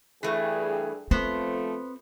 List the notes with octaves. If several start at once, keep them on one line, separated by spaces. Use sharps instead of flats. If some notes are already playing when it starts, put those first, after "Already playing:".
G2 E3 A3 G#4
F3 A3 B3 C4 C5